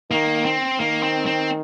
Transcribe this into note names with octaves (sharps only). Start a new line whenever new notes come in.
D#3 A#3
C4
D#3 A#3
C4
C4